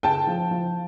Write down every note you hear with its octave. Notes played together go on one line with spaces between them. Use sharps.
C#3 G5 A5
F3
F3